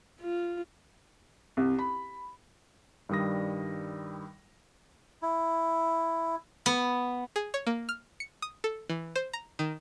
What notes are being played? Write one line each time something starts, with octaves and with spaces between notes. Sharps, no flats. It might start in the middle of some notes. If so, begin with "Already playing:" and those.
F4
C2
B5
G2 D#3 G3 D#6 A#6
E4
B3
G#4
C#5
A#3
F6
C#7
D#6
A4
E3
C5
A#5
D#3